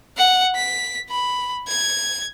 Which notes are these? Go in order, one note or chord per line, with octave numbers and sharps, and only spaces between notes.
F#5
B6
B5
G#6